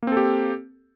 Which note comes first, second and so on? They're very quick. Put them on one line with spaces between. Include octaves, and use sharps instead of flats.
A#3 C4 A4 G4